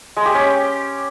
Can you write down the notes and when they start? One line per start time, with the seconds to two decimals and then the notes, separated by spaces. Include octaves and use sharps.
0.17 G#3
0.26 G4
0.34 C#4